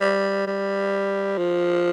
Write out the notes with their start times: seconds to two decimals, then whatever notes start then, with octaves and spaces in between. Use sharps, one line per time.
0.01 G3
0.47 G3
1.38 F3